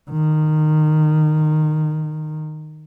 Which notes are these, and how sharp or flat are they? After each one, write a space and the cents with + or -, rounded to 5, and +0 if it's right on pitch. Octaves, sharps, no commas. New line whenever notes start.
D#3 -15